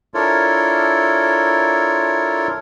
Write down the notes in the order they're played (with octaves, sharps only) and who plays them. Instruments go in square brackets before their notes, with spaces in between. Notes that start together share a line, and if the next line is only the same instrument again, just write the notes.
[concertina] D4 E4 F4 A4 A#4 C#5